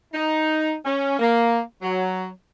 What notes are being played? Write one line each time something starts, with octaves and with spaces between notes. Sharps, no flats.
D#4
C#4
A#3
F#3